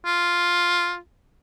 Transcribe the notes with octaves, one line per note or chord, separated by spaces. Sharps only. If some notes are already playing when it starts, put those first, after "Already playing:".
F4